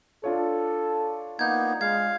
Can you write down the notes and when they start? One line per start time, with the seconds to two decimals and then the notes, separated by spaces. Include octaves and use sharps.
0.24 D4 F4 A4 C#5
1.39 A#3 B3 D#4 G6 G#6
1.81 G#3 F5 G#6